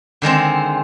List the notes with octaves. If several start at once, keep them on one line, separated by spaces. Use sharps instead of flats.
D3 D#3 G#3 C4